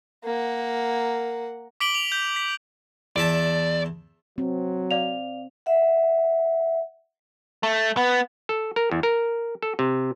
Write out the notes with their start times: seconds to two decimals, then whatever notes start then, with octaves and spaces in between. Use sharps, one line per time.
0.24 A#3 F#5
1.80 D6 B6 D7 F#7 G7
1.95 F7
2.12 G6
2.36 B6
3.16 E2 D5 E5 A5
4.38 F#3 C4
4.91 D5 F5 F7
5.66 E5 F#5
7.63 A3
7.97 B3
8.49 A4
8.76 A#4
8.91 E2
9.03 A#4
9.62 A4
9.79 C3